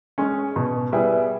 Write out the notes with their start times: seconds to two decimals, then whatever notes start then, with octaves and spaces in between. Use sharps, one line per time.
0.18 G#3 C#4
0.56 B2
0.92 G3 B3 E4 G#4